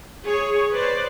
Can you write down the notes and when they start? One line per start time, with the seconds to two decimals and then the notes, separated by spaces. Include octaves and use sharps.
0.23 G#4 C#5
0.73 B4 C5 D5